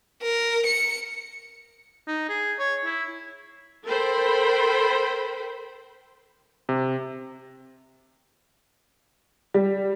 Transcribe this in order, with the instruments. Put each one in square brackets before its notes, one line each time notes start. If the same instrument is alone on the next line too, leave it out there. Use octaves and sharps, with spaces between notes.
[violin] A#4
C#7
[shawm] D#4
G#4
C#5
E4
[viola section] A4 A#4 C5 G5 B5
[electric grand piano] C3
[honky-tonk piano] G3